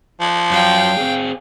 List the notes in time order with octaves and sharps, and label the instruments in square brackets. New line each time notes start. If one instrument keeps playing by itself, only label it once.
[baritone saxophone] F3
[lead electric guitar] F#2 [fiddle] F5 G5
[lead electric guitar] C4 G#4